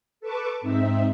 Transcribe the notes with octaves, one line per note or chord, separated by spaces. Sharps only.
A4 B4 A5 C#6 D6
G#2 C4 D#4 E5